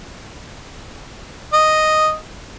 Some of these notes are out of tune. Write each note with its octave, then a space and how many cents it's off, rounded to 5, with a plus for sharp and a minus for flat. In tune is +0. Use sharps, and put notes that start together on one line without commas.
D#5 +0